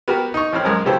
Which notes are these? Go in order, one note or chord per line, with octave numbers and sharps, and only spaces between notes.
B3 F#4 G4 A#4
D#4 C#6
A1 A2 C4 C5 B5 F6
B1 F#2 G#3 A#4 C6
C#3 F#3 B3 G4 A4 C5